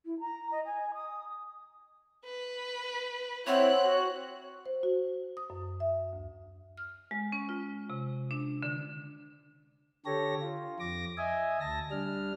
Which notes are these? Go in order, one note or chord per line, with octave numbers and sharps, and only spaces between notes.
E4
A#5
D#5
G#5
D#6
B4
C4 E4 C#5 F#5 C6 C#6 F#6
F#4
C5
F#4
D#6
F#2
E5
D2
F6
G#3
C#4
F4
C3
D4
D3
D3 G4 A4 C#5 A#6
F4
F2 D6 A#6
D#5 E5 G#5
D2 A5 A#6
G3 D4 F6